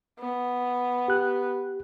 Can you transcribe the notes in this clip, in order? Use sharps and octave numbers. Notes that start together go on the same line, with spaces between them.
B3
G4 F#6